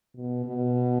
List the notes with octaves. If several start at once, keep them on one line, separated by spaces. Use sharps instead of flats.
B2
B2